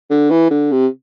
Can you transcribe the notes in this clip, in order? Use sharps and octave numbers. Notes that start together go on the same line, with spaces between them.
D3
E3
D3
C3